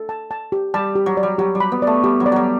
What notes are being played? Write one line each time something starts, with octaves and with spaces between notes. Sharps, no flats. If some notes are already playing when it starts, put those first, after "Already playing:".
Already playing: A4
A5
A5
G4
G3 A5
G4
F#3
D5
G3
F#3 G4
G3
B5
B3
A3 D5
G3 G4
F#3
D5
F#3 G3